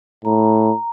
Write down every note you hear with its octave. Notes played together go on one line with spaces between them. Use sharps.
A2 A#5